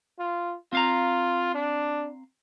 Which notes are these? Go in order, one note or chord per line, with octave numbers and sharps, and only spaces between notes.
F4
C4 F4 F5 A#5
D4